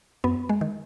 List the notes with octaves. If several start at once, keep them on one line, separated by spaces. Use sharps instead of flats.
F#2 B3
G#3
D#3